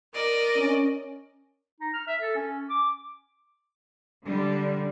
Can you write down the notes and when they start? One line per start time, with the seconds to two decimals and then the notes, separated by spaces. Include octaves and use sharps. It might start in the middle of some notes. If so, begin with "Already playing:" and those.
0.13 A#4 D5 D#5
0.58 C#4
1.80 D#4
1.94 F6
2.07 E5
2.21 A4
2.35 C#4
2.70 D6
4.25 D3 G3